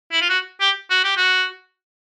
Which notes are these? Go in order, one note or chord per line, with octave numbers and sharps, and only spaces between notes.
E4
F4
F#4
G4
F#4
G4
F#4